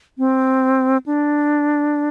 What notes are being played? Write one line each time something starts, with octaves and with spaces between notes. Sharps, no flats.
C4
D4